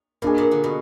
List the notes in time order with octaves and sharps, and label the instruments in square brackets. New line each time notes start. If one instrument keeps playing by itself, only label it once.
[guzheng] B2 [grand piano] A#3 D4 G#4
[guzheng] A#2
D3
B2